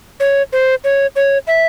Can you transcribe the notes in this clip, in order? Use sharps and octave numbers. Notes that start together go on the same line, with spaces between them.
C#5
C5
C#5
C#5
E5